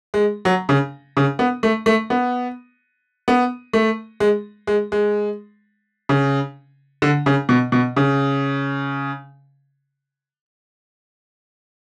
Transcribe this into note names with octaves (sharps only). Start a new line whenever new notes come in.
G#3
F#3
C#3
C#3
B3
A3
A3
B3
B3
A3
G#3
G#3
G#3
C#3
D3
C#3
B2
B2
C#3